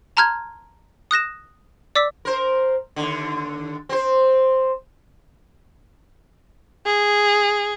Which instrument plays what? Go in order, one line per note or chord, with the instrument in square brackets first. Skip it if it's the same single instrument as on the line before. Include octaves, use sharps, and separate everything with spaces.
[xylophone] A5 A#5 C6 F6 G6 G#6
D#6 F#6 A#6 E7
D5 D6 E6 B6
[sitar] A#4 C5
D#2 D3
C4 C5
[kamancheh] G#4